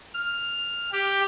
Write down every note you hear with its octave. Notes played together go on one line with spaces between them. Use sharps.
F6
G4